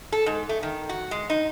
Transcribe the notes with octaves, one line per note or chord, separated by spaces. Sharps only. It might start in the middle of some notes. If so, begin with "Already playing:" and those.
A4
G#2
A3
D#3
F#4
G#3
D#4